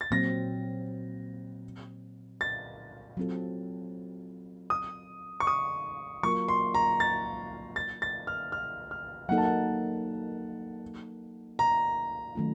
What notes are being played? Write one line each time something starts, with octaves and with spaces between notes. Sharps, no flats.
A6
A#2 F#3 C4 A#6
A6
F#3 C4 F4 A4
D#6
C#6
D#6
F#3 A#3 F4 A#4 C#6
C6
A#5
A6
A6
A6
F6
F6
F6
F#3 A#3 D#4 A4 F#5
A5
F#5
A#5
D#3 F#3 A3 C#4 F4